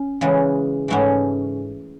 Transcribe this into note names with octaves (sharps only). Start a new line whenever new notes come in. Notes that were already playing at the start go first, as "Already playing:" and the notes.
Already playing: C#4
C#3 E3 G#3
G#2 E3 A3 C#4